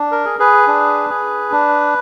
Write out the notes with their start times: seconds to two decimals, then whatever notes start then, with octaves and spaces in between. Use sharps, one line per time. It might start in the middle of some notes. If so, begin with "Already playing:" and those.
Already playing: D4
0.11 A#4
0.25 G#4
0.39 G#4 B4
0.67 D4
1.10 G#4
1.52 D4